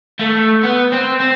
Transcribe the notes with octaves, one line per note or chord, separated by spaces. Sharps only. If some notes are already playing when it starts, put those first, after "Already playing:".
A3
B3
C4
C4